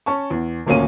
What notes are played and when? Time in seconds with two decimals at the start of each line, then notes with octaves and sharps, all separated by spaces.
0.06 C#4 A5 C#6
0.30 E2
0.66 D#1 D2 A#3 C#4 D#7